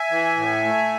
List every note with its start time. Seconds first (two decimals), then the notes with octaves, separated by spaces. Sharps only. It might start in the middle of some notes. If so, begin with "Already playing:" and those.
Already playing: E5 G#5
0.10 E3
0.37 A2
0.65 A3